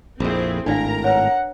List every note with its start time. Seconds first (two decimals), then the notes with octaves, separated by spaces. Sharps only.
0.20 A#1 F2 C4 E4 G#4
0.66 G#1 A2 D4 A#4 D5 F5 A#5
1.04 B4 C#5 F#5